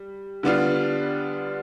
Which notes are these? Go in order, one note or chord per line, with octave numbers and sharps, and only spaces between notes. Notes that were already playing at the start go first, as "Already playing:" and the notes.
Already playing: G3
D3 G3 B3 D4 F4